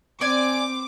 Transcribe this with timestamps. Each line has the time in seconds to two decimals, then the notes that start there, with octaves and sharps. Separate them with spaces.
0.21 C4 D5 G#5 D6